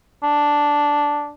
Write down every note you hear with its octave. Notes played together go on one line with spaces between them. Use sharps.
D4